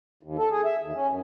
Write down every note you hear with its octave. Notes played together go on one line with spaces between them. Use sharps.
D#2
A4
G#4
E5
D#2
C#4
F#2